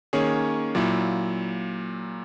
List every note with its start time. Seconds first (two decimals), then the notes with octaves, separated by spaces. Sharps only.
0.13 D#3 A#3 C#4 G#4 C#5
0.75 A#2 F#3 A#3 E4